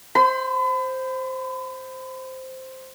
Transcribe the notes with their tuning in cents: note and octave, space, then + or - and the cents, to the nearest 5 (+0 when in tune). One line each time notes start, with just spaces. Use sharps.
C5 +0 B5 +40